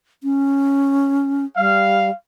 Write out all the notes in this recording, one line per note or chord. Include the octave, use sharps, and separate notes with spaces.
C#4
G3 F5